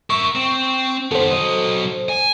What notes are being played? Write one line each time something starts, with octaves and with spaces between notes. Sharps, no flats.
A#4 E5 C#6
C4
D#3 B3 A4 C5
F#3 D#5
G#5